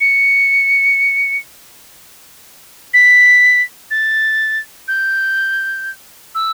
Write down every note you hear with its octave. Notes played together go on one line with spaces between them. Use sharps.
C#7
B6
A6
G6
E6